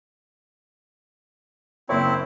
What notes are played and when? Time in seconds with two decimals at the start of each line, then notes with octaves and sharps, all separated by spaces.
1.89 F#1 A#3 C4 E4 C#5